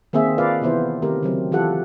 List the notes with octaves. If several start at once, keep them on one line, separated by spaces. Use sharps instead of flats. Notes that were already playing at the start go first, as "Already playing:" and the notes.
D#3 A#3 C4 G#4 E5
F4 A#4 B4 D5 F5
C3 E3 B3 E4 C5
D#3 A3 C4 G4 A#4
C#3 F#3 C4
E3 F4 G4 A4 F#5